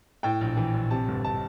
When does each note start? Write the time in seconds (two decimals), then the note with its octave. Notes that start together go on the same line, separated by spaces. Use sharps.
0.23 A2 G5
0.41 A#1
0.57 E3
0.74 A#1
0.90 C3 A5
1.08 G1
1.25 A5